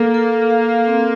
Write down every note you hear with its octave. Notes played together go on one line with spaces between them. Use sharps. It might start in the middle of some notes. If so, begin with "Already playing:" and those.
Already playing: A#3 A4
A4
F5
C4